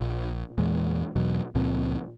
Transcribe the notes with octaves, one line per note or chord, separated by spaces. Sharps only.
A#1
E2 A#2 E3 G#3
E1 E2 B2 F#3
C#2 A#2 F3 C4